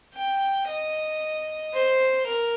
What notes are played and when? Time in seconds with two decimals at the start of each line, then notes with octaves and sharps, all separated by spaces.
0.14 G5
0.68 D#5
1.74 C5
2.26 A#4